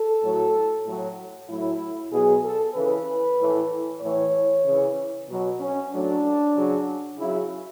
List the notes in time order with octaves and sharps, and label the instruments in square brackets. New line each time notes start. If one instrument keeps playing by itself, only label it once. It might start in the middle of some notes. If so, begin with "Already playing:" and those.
Already playing: [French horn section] A4
A2 F#3
A2 F#3
A2 F#3 E4
B2 F#3 G#4
A4
C#3 E3 B4
A2 E3
A2 E3 C#5
C#3 E3
B2 F#3
C#4
A2 F#3 D4
C#3 F#3
C#3 F#3 E4